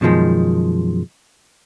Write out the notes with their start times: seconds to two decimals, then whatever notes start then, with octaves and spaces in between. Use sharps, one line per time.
0.01 F#2 B2 D#3 F3 G#3